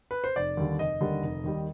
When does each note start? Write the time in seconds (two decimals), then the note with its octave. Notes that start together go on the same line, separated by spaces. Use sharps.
0.11 B4
0.24 C5
0.36 F1 D5
0.57 D#2 D3 G3
0.79 F1 D#5
1.01 D#2 D3 G3
1.22 F1
1.44 D#2 D#3 G3